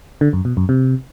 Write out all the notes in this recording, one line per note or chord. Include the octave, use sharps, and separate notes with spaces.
D3
F#2
B2
F#2
C3